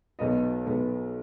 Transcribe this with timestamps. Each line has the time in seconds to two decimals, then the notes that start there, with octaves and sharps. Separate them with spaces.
0.19 B1 B2 G#3 B3 D#5
0.66 B1 B2 G#3 B3